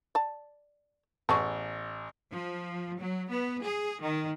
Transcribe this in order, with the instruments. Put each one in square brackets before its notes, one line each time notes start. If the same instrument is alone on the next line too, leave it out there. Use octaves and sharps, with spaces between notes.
[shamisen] D5 A5
[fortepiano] A1 [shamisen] B3 G#4 [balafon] A5 C#6
[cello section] F3
F#3
B3
G#4
D#3